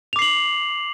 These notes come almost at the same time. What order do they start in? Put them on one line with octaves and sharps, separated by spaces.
F7 D6 C7 F#7